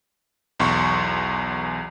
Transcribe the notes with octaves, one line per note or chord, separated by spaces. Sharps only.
B1 E2 C6 C#6